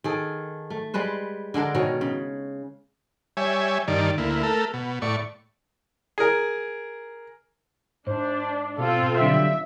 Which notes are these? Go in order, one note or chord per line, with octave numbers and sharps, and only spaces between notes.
D#3 G#4 A4
A3
G3 G#3 B4 C5
D3 G#3 D4 A#4
B2 D#3 G#4 C#5
C#3
G3 C#5 E5 G#5
G2 D#3 D5
D2 A#3 E4
A3 A4 A#4
B2
A2 D5 C#6
G#4 A#4
G#2 D4 C5
B2 C4 F4 A4
B1 D3 G3 E5